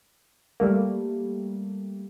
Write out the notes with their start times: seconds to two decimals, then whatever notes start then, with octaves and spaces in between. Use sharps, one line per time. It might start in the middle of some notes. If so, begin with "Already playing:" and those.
0.60 G3 A3 A#3